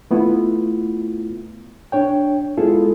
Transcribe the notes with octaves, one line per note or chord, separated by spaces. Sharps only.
A3 B3 E4 F4
D4 C#5 G5
G#3 B3 E4 F4 G#4 A4